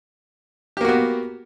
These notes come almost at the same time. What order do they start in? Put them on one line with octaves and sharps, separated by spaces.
G4 A#3 F#4 B3